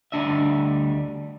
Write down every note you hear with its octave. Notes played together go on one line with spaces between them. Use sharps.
D2 D3 G3 D4 D#5 E5